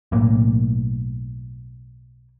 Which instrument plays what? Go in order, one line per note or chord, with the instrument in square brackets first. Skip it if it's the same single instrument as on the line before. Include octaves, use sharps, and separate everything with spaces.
[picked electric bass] B1 A2 A#3